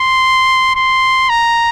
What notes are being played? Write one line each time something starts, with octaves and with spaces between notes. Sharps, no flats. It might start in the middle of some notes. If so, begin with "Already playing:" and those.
Already playing: C6
C6
A#5